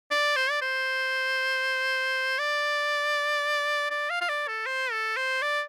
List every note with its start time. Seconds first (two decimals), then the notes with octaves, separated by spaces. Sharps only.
0.11 D5
0.36 C5
0.50 D5
0.62 C5
2.39 D5
3.90 D5
4.10 F5
4.21 F5
4.29 D5
4.48 A4
4.66 C5
4.91 A4
5.17 C5
5.42 D5